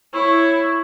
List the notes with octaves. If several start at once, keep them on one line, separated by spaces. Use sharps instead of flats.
E4 C#5